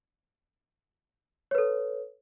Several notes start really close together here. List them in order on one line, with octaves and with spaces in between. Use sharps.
C#5 B4 A4